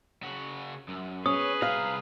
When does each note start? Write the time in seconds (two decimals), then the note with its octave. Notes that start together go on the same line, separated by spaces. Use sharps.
0.22 C#3 F#4
0.88 F#2
1.26 C#4 G#4 B4 D#6
1.62 C2 F5 A#5